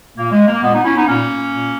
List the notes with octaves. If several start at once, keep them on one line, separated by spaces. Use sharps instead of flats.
A#2 A#3
G#3
A#3
A#2 G#3 B3
B3 D#4
C#4 E4
B3 D#4
A#2 A#3 C#4
A#2